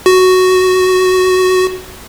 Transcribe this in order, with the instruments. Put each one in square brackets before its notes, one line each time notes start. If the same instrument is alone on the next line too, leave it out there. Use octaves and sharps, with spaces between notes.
[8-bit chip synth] F#4